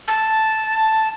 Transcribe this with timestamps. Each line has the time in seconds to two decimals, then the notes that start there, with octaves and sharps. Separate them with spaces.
0.08 A5